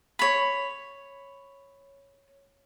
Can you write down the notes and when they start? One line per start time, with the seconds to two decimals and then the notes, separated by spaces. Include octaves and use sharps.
0.19 C#5 B5